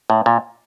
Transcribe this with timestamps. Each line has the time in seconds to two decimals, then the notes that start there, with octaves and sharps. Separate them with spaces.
0.10 A2
0.26 A#2